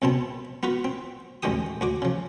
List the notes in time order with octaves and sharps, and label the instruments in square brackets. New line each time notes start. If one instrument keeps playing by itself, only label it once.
[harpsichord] C2 B2 B3 C4 A5
B3 F4 F#4 B4
C4
A1 D2 G#3 A3 G4 D#6
D2 F#4 D6
C#3 F3